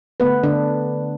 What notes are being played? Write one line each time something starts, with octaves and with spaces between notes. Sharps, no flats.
D3 A3 B3 B4
D3 D4